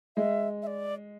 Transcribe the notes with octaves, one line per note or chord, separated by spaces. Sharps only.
G#3 E5
E5
D5